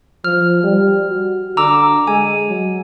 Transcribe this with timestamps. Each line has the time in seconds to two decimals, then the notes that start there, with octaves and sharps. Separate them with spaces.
0.24 F3 F6
0.64 G3
1.10 F#4
1.57 D3 A#5 D6 E6
2.07 G#3 G#5
2.49 F#3